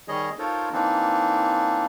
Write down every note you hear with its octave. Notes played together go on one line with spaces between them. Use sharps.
D#3 G3 G#4 C#5 D#5
D#4 F4 A4 A#4 C5 C#5
E3 A#3 C4 D4 D#4